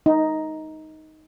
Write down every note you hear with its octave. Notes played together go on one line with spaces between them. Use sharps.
D#4